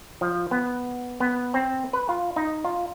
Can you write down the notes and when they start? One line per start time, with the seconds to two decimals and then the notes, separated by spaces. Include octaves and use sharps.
0.21 F3
0.51 B3
1.20 B3
1.54 C4
1.93 B4
2.09 F4
2.36 D#4
2.65 F4